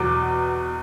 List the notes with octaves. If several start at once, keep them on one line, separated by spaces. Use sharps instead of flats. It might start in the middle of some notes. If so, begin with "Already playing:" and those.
Already playing: E2 B2 F#3 D6